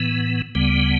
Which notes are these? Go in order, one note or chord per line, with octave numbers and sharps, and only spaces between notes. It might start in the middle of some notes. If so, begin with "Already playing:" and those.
Already playing: A2 E3 B3
D2 C#3 G3 B3